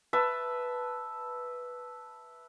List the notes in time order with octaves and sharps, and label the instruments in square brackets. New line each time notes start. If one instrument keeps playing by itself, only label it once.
[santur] B4 E5 A5